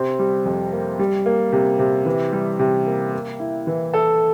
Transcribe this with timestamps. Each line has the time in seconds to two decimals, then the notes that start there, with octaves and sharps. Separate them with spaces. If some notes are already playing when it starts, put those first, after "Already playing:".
Already playing: C3 C4
0.19 G3
0.45 F2
0.72 A#3
0.99 G3
1.26 A#3
1.52 C3
1.79 C3
2.06 E3
2.33 G3
2.59 C3
2.86 A#3
3.13 A#3
3.39 E4
3.67 E3
3.93 A4